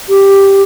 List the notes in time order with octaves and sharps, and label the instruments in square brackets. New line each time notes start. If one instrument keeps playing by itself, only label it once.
[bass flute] G4